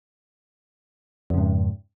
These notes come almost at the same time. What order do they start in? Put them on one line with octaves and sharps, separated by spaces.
F2 C#3 G#2